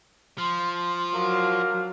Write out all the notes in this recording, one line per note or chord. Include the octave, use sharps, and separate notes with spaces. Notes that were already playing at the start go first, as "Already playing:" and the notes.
F3 C6
F#3 D4 A#4 F5